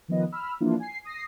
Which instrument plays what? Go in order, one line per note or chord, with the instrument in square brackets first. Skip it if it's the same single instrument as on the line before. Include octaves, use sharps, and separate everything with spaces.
[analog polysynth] D#3 F3 B3 D#5
B5 E6 F6
E3 F3 A#3 D4 E4 F4
G#5 C7
D#6 A#6 C7